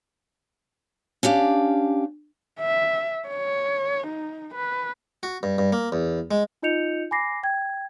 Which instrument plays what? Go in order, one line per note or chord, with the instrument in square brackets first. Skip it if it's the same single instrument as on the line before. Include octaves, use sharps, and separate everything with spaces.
[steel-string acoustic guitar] C#4 D4 G4 F5
[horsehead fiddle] E5
C#5
D#4
B4
[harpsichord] F#4
G2
G2
A#3
E2
G#3
[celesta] D#4 F4 D#5 G6 C#7 F7
G#5 B5 D6 A#6 C7
G5 G#6